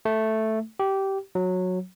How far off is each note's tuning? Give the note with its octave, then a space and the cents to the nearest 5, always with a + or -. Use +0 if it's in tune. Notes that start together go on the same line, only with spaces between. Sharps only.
A3 +0
G4 -15
F#3 -15